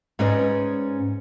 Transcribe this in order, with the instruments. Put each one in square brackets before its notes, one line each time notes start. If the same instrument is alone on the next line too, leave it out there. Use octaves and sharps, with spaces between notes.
[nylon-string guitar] G#2 C#4 B4 D5 D#5